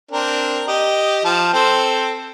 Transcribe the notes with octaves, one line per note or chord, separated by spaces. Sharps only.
C4 D4 A#4
G4 D#5
F3 A5
C4 A4 C5